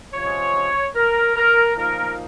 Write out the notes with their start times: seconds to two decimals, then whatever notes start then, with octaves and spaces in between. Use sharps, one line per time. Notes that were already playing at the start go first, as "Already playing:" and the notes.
0.12 C3 F3 G#3 C#4 C#5
0.95 A#4
1.36 A#4
1.76 A#2 F3 A#3 D#4 A#4